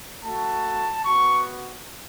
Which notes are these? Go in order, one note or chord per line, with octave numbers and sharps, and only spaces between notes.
A3 F#4 A5
B3 F#4 C#6